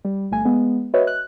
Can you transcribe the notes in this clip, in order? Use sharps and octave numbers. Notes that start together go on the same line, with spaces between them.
G3
G1 A3 G#5
G#3 B3
F#4 B4 C#5 D#5 E5
F#6